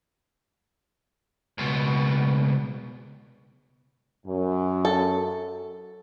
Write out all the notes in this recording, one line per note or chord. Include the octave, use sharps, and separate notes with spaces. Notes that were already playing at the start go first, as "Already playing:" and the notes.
C#2 B2
F#2
A4